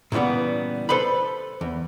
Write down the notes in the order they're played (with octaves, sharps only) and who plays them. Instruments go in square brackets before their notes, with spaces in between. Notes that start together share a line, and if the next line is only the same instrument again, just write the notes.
[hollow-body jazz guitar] A#2 C#3 E3 G3 B3
A4 B4 C5 B5
E2